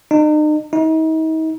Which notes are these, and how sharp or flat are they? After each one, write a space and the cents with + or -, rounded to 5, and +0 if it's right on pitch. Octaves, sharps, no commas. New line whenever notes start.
D#4 -40
D#4 +40